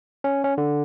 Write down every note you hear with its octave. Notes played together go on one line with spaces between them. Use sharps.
C#4
C#4
D3